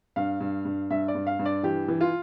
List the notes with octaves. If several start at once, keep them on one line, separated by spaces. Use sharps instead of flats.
G2 F5
G2
G2
G2 E5
D5
G2
F5
G2
D5
E3 G4
E3
F4